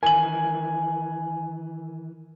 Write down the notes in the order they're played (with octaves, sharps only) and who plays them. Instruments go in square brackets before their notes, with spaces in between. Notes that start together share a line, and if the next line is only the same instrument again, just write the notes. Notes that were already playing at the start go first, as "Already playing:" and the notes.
[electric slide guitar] D#3 E3 A#4 [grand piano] G#5 F#7